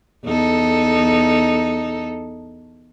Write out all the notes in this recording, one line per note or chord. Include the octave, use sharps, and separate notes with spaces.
E2 D#4 A4